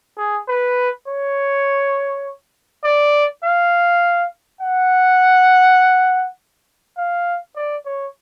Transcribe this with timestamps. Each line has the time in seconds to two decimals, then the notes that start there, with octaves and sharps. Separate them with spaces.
0.18 G#4
0.48 B4
1.07 C#5
2.84 D5
3.44 F5
4.61 F#5
6.98 F5
7.56 D5
7.86 C#5